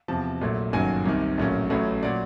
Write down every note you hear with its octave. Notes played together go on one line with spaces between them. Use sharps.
E2 C3 F3 A5
A#1 A#2 F#3 A3
G1 F#2 D#3 F#3 A#3 G#5
C2 C3 D#3
A#1 A2 F#3 A#3 C#4
A1 A2 F#3 A3 C#4
A#2 F#3 D5